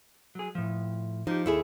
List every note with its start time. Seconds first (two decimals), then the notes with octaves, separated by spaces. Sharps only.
0.35 F#3 G#4
0.55 A2 F3
1.27 F3 D#4 G4
1.46 D#2 E4 G#4 A4